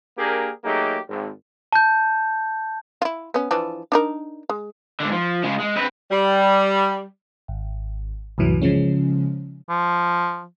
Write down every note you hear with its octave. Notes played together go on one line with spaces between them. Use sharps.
A#3 D4 G4 G#4 A#4
F#3 A3 A#3 D#4 G4 G#4
G#1
A5 G6
E4 F4
B3 C#4
E3 F3 D4
D4 D#4 A#4
G#3
G#2 D3
F3
C#3 G#3
G#3
C4 B4
G3
G#1
C2 F#2 A2 E3 F#3
C#3 F3 G#3 C#4
F3